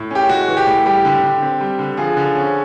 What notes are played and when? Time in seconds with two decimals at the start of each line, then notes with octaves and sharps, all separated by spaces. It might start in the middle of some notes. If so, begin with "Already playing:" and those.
Already playing: A2
0.11 C#4 G4
0.29 G#3 F#4
0.48 E3
0.57 G4
0.67 A2
0.86 G3 G4
1.05 D3
1.23 D3
1.42 C4
1.61 G3
1.79 D3
1.97 F3 G#4
2.17 D3
2.35 C#4